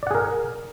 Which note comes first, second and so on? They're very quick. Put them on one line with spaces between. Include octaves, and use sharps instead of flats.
D5 F#5 G#4 A#4